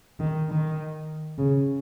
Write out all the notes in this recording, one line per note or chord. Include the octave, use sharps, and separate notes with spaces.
D#3
D#3
C#3